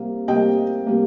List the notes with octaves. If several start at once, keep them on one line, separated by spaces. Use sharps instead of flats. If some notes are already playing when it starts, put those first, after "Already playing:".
Already playing: C3 G3 A#3
C3 G3 A#3 D#5 G5
C3 G3 A#3